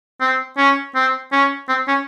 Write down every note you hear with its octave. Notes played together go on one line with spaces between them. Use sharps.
C4
C#4
C4
C#4
C4
C#4